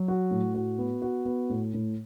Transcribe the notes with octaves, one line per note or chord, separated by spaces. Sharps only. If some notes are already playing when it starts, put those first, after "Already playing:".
Already playing: F#3
F#4
A2
F#4
B3
F#4
B3
A2
A2